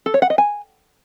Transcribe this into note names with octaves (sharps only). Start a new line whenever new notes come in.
A4
C#5
F#5
D#5
G#5